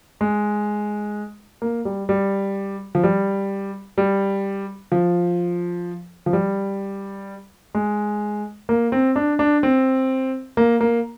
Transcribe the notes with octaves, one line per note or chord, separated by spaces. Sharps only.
G#3
A#3
G3
G3
F3
G3
G3
F3
F3
G3
G#3
A#3
C4
D4
D4
C4
A#3
A#3